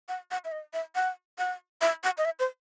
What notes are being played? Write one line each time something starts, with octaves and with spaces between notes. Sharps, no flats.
F#5
F#5
E5
D#5
E5
F#5
F#5
E5
F#5
D#5
E5
C5